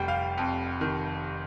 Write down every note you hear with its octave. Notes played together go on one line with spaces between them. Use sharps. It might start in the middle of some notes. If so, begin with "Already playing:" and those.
Already playing: F1 G3 G5
F5
F2
D#3